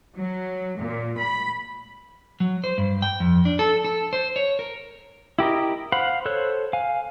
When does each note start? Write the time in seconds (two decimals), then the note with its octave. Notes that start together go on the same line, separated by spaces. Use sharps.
0.17 F#3
0.78 A#2
1.18 B5
2.40 F#3
2.64 C5
2.78 G2
3.02 G5
3.20 F2
3.45 D4
3.59 A4
3.85 A4
4.13 C5
4.36 C#5
4.59 A#4
5.39 E4 G4 A#4 D#5
5.92 C5 F5 F#5 B5
6.26 A4 C5 C#5 F#6
6.73 F5 G#5